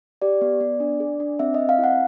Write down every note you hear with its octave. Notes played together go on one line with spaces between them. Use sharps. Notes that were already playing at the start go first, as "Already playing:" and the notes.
G4 D5
B3
B3
D4
G#4
D4
C4 E5
C4 D#5
F5
E4 F#5